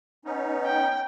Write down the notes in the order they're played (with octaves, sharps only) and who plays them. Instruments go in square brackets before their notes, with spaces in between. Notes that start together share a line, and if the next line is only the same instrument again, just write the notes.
[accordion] B3 C#4 D#4
[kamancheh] G5